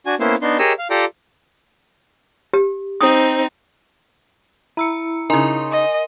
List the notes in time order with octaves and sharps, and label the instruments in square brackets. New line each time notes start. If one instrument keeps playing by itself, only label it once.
[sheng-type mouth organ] D4 F#4 G#5
A#3 B3 C#4 E4 C5
B3 D4 D#4 C6
G4 G#4 A#4 C#5 D#5 E6
F5
F4 G4 A4 D5 G5 A#5
[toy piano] G4
[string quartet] C4 D#4 [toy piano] D#6
[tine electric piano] E4 [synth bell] A#5 E6 C#7
[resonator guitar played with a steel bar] C#3 D#4 [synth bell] A#4 G#5 C6
[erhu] D#5